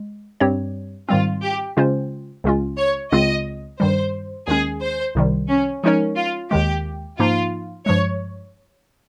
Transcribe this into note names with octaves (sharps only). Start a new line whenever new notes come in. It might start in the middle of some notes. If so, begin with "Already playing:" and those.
Already playing: G#3
G2 G3 C4 G4 C#5
G#2 D#3 G3 C4 F4
G4
C#3 G#3 C#4 F4 C5
C#2 C#3 G#3 C#4 F4
C#5
C#2 C#3 G#3 C4 F4 D#5
G2 D#3 G3 C5
D#2 D#3 G#3 C#4 G#4
C5
C2 C3 D#3 G3
C#4
F3 G#3 C#4 D#4 A#4 C#5
F4
D#2 D#3 G#3 G4
G#2 F3 A#3 D#4 F4
G2 F3 G#3 C#5